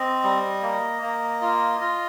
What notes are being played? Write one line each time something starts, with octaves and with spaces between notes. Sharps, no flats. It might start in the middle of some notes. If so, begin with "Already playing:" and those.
Already playing: C4 D#5
G3
A#3
A#3
F4
F4